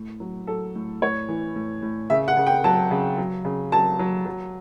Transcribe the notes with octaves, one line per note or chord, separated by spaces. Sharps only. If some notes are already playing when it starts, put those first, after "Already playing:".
Already playing: A2
F#3
F#3 A4
A2
A2 C#5
E3
A2
A2
C#3 E5
F#5
C#3
G5
F#3 A5
C#3
F#3
C#3
F#3 A5
F#3
F#3